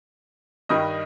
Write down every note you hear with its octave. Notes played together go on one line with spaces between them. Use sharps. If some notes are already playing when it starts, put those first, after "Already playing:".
G2 D#3 G3 D#5 D#6